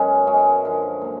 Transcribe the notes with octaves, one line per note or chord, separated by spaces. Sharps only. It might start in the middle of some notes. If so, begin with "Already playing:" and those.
Already playing: F#2 C#3 F#3 G#3 B3 C#4
F#2 C#3 F#3 G#3
F#2 D3 F3
A#2 F#3